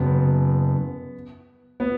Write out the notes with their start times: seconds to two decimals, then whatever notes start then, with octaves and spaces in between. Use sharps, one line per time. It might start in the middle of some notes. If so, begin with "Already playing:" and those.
Already playing: F#2 C#3 F#3 B3
1.80 B3